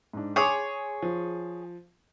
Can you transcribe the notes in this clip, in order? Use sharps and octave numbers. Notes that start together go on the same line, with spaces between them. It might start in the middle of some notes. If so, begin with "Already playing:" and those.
G#2 D4
G#4 C#5 C6 D6 C#7
F3